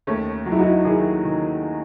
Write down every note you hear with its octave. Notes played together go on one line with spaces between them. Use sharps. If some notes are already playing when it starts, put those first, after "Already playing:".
D#2 A3 C#4
F#3
E4
D#4 F#4
D#3 E4 G#4
D#3